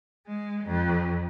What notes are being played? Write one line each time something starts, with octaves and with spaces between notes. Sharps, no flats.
G#3
F2